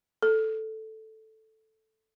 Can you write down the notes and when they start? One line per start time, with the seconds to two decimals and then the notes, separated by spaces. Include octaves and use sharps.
0.23 A4